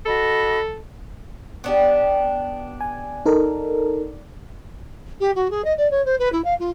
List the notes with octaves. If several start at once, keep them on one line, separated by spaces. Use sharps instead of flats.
F#4 A4 D#5 B5
B3 D4 G4
G#5
D#4 A4 A#4
G4
F#4
G#4
D#5
D5
C#5
C5
B4
E4
F5
F4